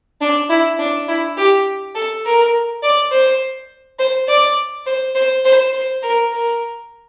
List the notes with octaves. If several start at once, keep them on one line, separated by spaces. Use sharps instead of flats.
D4
E4
D4
E4
G4
A4
A#4
D5
C5
C5
D5
C5
C5
C5
C5
A#4
A#4